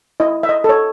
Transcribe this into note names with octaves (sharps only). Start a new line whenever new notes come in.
E4 D#5
E5
D#5
A4 C#5